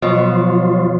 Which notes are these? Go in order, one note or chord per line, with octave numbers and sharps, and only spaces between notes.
B2 F3 F#3 F4